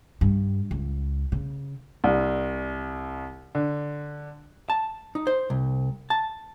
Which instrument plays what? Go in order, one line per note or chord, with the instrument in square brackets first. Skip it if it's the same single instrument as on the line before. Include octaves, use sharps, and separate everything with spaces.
[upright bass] G2
C#2
C#3
[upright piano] C2
D3
[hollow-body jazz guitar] A5
D#4
C5
C2
A5